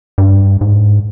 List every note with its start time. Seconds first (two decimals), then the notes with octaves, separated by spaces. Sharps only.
0.18 G2
0.61 G#2